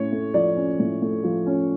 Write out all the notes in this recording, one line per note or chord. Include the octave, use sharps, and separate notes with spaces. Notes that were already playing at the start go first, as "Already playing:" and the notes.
Already playing: A2 C#4 C#5
A3
F3 D5
C#4
A2
A3
F3
C#4